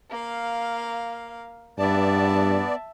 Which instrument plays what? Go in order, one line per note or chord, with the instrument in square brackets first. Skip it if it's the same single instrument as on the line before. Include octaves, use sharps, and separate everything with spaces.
[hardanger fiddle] A#3 F5
[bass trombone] G2 [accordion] B3 D5 [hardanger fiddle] E5 A5